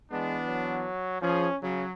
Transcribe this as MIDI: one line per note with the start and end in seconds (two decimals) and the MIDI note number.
0.11 0.87 52
0.11 0.37 56
0.11 0.87 59
0.11 0.87 62
0.46 1.21 54
1.22 1.47 53
1.22 1.56 61
1.22 1.47 68
1.62 1.83 49
1.62 1.93 54